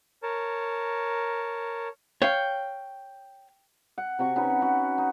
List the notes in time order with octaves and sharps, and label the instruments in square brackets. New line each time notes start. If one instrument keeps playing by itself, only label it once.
[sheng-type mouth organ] A#4 C#5 A5
[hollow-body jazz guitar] C#5 F5 [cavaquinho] G5
[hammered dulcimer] F#5
C3 F#4 C#6
C#4 D#4 F#4 B4
F#4
D#4